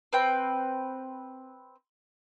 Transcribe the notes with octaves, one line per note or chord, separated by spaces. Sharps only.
C4 B4 G5